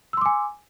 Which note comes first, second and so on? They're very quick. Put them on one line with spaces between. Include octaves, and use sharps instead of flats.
E6 C6 D6 G#5